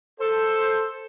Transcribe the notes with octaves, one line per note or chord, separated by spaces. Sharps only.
A4 C5